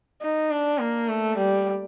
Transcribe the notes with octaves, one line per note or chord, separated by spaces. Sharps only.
D#4
D4
A#3
A3
G3